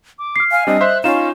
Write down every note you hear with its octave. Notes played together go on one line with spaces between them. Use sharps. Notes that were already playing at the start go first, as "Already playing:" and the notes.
D6
F6 C7
F5 G#5
G3 C4 D4 D#5
C5 E5 C6 F#6
C#4 D#4 F4 F5 E7